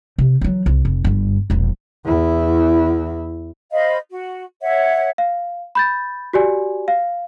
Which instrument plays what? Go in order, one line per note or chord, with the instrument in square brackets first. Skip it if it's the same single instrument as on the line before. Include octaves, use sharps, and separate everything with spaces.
[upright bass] C3
E3 F#3
C2
F1
G1 G2
E1 A#1
[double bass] E2 E4
[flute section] C5 D#5 F5 B5
F#4
C#5 E5 F#5
[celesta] F5
B5 G6 A6
F#4 G4 D5 G#5
F5